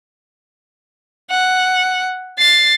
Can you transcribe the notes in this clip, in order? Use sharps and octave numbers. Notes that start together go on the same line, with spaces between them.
F#5
A6 C7